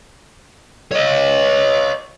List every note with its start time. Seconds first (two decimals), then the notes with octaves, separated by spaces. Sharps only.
0.92 C#5 D#5